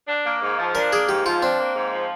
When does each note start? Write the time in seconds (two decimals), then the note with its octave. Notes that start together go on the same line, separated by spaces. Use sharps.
0.08 D4
0.25 A#3
0.42 G#2
0.59 F3
0.75 D4 A#4
0.92 A#3 G#4
1.08 G#2 G4
1.25 F3 F4
1.42 C4 D4
1.59 A#3
1.75 G#2
1.93 F3